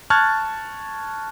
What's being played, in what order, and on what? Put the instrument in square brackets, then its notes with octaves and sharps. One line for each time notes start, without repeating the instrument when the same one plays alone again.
[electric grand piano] A5 C#6 F6 F#6 G#6 A6